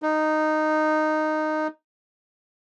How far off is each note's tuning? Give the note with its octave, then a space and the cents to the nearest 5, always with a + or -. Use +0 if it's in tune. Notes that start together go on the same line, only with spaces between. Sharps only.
D#4 -10